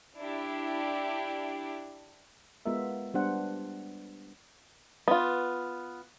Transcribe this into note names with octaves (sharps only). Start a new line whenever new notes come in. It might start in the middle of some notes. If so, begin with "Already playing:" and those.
D4 E4 G4
G#3 B3 F4 A#4 E5
G3 B3 D4 C5 F#5
B3 F4